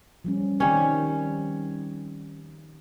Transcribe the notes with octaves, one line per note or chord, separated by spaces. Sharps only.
F3 G3 C#4
D#3 G3 C4 C#4 D#4